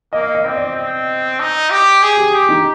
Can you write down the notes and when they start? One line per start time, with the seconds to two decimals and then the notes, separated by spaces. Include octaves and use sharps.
0.13 A#3 D#5
0.35 D#5
0.45 C4
0.55 D5
0.76 C4
1.40 D#4
1.70 G4
2.02 G#4
2.17 G4
2.34 G4
2.49 D#4